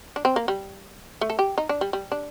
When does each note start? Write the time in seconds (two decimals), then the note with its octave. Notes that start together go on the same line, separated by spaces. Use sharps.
0.16 D4
0.25 C4
0.36 A#3
0.48 G3
1.21 A3
1.30 A4
1.39 G4
1.58 D#4
1.69 D4
1.81 G3
1.93 G3
2.12 D4